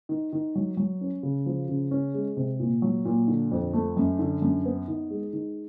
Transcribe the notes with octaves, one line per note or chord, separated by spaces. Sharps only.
D#3
D#3
F#3
F#3
C#4
C#3
F3
C#3
C#4
G#3
C3
A#2
F#3
A#2
D3
F2
A3
F#2
D3
F#2
B3
D#3
G#3
D#3